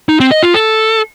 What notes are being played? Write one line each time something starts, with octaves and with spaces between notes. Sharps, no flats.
D#4
C4
D#5
F4
A4